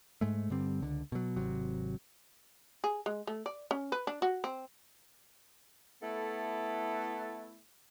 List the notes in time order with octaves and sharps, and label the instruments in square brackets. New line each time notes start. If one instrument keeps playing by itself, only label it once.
[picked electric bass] G#2 G#3 A3
G2 D3 G3 C4
C#2 D3
B2 F#3
G#1 C3 F#3
[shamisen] G#4
G#3
A3
D5
C#4
B4
D4
F#4
C4
[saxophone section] A3 B3 E4 A4